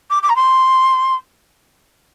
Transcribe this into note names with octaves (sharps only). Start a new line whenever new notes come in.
D6
D6
A#5
C6